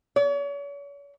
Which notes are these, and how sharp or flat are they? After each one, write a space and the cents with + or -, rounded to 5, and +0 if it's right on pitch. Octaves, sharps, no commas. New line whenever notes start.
C#5 +40